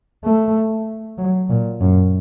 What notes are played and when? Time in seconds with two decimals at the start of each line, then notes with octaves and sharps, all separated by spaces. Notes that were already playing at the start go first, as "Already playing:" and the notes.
0.24 A3
1.18 F#3
1.49 A#2
1.81 F#2